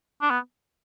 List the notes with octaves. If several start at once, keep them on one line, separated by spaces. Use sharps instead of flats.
D4
B3